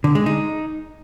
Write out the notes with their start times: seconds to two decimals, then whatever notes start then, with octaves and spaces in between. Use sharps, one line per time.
0.04 D3
0.15 G#3
0.26 D#4